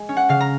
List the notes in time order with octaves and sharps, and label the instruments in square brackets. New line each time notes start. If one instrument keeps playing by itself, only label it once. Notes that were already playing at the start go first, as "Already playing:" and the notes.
Already playing: [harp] G#3
C#4
F#5
C#3 F5
A#5